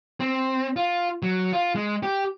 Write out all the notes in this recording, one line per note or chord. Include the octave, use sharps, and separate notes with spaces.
C4
F4
F#3
F4
G#3
G4